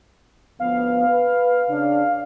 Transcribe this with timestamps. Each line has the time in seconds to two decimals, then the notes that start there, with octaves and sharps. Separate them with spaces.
0.60 D2 F3 B3 F5
1.07 B4
1.70 C#3 D4